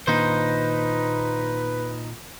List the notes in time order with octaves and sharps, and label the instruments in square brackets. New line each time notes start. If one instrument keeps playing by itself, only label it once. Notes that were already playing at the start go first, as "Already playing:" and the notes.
[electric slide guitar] A#2 [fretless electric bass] D#3 A#3 D4 [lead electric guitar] D#4 C5 [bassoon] B4